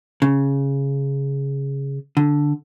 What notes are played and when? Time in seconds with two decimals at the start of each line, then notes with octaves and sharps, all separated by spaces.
0.22 C#3
2.17 D3